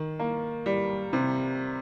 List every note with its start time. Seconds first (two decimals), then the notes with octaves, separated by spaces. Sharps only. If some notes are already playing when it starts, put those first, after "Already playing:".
Already playing: D#3
0.19 A#3
0.66 G3
1.13 C3